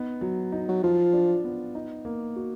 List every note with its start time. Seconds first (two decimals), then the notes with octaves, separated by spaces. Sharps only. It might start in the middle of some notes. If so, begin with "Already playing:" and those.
Already playing: B3 D#4
0.21 F#3
0.52 D#4
0.69 F#3
0.83 F3 F4
1.13 D4
1.44 B3
1.75 D#4
2.05 A#3
2.36 F#4